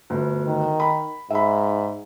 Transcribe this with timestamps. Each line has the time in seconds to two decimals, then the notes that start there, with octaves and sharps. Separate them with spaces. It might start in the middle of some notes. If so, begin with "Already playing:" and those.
0.10 G1 D2
0.47 D#3
0.80 B5
1.30 G#2 E5 B5